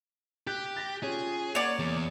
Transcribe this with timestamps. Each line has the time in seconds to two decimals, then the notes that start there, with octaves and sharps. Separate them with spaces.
0.47 G4 F#6 G6 B6
0.76 A6 A#6
1.03 C#4 F4 G#4
1.55 A#3 C#5 D5 F#5 D#7
1.79 E2